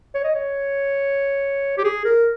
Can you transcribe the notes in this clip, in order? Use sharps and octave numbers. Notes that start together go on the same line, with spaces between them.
C#5
D#5
C#5
G4
G#4
A#4